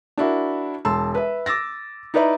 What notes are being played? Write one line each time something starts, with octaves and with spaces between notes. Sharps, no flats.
D4 E4 F#4 A#4
E1 A5 C6 E6
B4 E5
D6 E6 A6 A#6
D#4 E4 B4 D5 E5 A#5